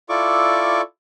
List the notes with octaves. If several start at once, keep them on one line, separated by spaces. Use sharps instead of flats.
E4 F4 A4 D5 C#6 D6